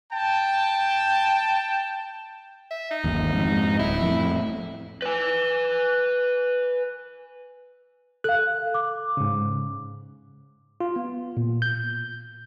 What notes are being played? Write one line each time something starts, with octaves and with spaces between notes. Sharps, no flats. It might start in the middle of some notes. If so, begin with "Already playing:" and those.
G5 A5
E5
D#4
G1 D#2
F2 G#2
D1 E4
F2 A2
B4 G#5
A4 F5 F#6
D6
G#2 C#3
F4
B3
A#2
G6